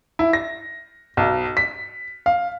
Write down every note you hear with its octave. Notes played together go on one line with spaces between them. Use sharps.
E4
A#6
B1
B6
F5